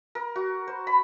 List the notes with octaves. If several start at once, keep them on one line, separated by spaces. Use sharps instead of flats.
A#4
F#4
C5
B5